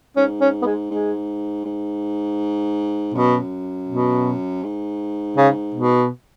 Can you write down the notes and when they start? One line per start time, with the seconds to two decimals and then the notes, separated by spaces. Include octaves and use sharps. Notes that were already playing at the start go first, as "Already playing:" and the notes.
0.16 G#2 C#4
0.41 C#4
0.62 B3
0.66 G#3
0.90 G#2 G#3
1.65 G#2
3.14 F#2 B2
3.88 B2
4.63 G#2
5.37 C#3
5.75 B2